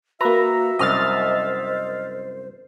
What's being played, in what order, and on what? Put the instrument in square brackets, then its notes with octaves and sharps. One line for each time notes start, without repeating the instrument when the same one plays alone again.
[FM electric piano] A#3 A#5 [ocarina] F#4 [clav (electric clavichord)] B4 [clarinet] E5
[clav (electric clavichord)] C2 F#2 [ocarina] C5 [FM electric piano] D#5 F6 A6